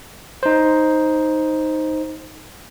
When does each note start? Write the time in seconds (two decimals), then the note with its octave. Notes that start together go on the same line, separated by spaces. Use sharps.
0.43 D#4 C5